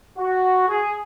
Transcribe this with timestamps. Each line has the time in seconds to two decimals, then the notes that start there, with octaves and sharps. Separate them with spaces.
0.19 F#4
0.68 G#4